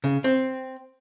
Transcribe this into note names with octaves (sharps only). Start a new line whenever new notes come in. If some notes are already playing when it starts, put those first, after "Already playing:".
C#3
C4